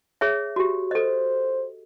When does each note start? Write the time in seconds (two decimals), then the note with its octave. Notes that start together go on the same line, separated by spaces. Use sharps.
0.21 G#4 C#5 E5
0.56 F#4 G4
0.91 A4 C5 D#5